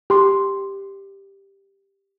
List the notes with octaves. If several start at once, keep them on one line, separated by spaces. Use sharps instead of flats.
G4 C6